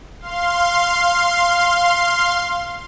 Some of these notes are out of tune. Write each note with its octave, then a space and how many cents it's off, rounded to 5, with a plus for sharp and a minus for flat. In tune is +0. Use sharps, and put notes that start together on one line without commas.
F5 -5 C6 +5